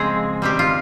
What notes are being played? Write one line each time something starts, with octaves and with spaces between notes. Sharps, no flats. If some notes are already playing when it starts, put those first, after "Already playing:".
Already playing: C#3 F3 G#3 C4 G#4
D#3 G3 C4 G4
F4